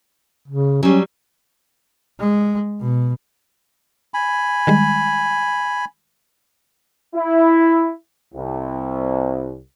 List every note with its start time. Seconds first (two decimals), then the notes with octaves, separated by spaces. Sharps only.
0.48 C#3
0.83 F#3 G3 C#4
2.19 G#3
2.80 B2
4.14 G#5 B5
4.67 D#3 G3 G#3
7.15 E4
8.34 C2